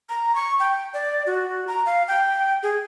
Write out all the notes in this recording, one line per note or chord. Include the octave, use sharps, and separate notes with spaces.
A#5
C#6
G5
D5
F#4
A#5
F5
G5
G#4